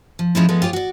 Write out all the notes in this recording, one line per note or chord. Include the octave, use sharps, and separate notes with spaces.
F3
G#2 F3 G#3 C#4 D#4 E4
F3 G#3 A3 B3
F4 G4 G#4 C#5
F#4 D5